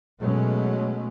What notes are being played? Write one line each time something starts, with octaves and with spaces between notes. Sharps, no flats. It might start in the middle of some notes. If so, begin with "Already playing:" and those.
B2 F#3 G#3 A3 C#4